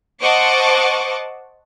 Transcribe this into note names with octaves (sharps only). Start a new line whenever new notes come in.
C5 D#5 F#5 A5 C#6 D6